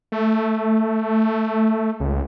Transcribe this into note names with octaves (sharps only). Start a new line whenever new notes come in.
A3
C#2